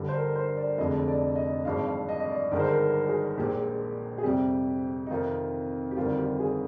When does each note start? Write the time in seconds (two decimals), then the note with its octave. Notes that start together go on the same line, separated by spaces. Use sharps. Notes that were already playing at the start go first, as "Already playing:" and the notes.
Already playing: G1 G2 D3 G3 G4
0.09 C5
0.15 A#4
0.36 C5
0.57 D5
0.78 F1 F2 D3 F3 G#3 D#5
1.08 D5
1.36 D#5
1.65 G#1 G2 F3 G#3 F5
1.86 F5
2.09 D#5
2.20 D#5
2.30 D5
2.51 G1 G2 D#3 G#3 A#4
2.60 C5
2.68 A#4
3.08 G#4
3.38 A#1 A#2 G#3 G4
4.18 G#4
4.24 F2 C3 G3 G4
5.07 D#4
5.10 F2 C3 D#3 F4
5.91 G4
5.96 G1 F2 D#3 G3 F4
6.18 G4
6.40 G#4